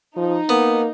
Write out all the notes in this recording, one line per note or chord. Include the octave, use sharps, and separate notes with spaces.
F3 D#4
A#3 B3